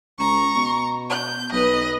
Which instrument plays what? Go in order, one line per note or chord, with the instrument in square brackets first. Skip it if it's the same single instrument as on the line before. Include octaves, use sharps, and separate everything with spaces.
[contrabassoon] C#2 [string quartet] A#5 C#6
[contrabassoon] B2
[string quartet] G6
[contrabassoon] B1 [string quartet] B4 D#5